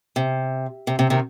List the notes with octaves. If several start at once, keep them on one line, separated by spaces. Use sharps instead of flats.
C3
C3
C3
C3 D#3